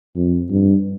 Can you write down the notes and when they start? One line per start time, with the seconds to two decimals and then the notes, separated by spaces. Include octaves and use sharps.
0.16 F2
0.50 G2